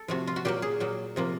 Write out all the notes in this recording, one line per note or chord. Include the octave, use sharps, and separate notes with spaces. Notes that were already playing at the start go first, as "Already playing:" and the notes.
Already playing: A4
C3 F3 A3 F#4
F4
F#4
A#2 F#3 A#3 G4
G#4
A#2 F#3 A#3
C3 F3 A#3